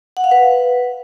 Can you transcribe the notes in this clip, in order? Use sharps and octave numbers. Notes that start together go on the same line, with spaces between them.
F#5
F5
B4